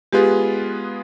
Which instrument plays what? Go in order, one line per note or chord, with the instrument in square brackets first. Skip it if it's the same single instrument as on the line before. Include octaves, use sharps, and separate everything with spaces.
[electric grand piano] G#3 B3 F4 G#4 B4 [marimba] G4